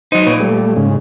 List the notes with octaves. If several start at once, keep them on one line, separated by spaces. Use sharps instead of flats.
F#3 D#4 C5
A#2 B4 C#5
G3 A3
G#2 C#3